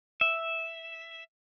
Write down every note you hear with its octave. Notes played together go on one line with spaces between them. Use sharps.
E5